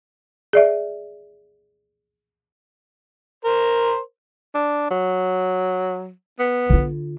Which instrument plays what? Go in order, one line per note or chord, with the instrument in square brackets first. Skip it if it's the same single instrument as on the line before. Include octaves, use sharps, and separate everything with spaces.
[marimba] G#4 D5 E5
[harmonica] A#4 C5
[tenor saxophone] D4
F#3
B3
[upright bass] D3 F4